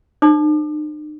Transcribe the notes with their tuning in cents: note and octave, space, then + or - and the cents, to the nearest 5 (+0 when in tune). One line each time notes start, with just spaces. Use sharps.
D#4 -45 C5 +30 D6 +35